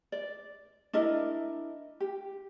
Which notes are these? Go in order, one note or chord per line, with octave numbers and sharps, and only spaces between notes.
D5
D4 E4 A#4 D#5
G4